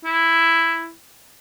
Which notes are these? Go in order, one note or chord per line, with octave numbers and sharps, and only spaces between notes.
E4